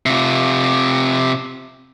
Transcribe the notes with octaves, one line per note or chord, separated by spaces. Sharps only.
C3 F4